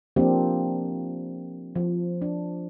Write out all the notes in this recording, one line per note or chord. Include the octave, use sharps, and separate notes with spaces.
F3 A#3 C4 D4 G4
F3
D4